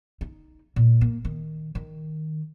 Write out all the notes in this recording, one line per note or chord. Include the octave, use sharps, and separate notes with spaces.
D#4
A#2
A#3
D#3
D#3